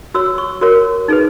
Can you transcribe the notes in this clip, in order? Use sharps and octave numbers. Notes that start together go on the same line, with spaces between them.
F#4 C#5 E6
C#6
F#4 A#4 C#5
D#4 G#4 B4